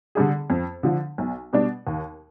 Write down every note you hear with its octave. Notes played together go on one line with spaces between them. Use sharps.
D3 G3 D4 G#4
F2
D3 F3
B1
B2 G3 D4
D#2